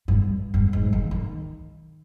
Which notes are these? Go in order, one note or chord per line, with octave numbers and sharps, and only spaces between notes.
G2
G2
G#2
D#3
D#3